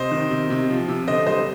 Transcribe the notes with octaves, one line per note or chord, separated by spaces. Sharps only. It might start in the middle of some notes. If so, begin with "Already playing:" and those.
Already playing: C3 C5 D#5
D#3
C3
C3
F3
C3
D3 C5 D#5
G3 C5 D#5